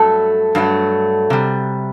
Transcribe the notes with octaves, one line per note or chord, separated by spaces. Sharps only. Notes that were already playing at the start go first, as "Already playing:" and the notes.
Already playing: G2 F#3 A3 A4
G2 F#3 A3
C3 G3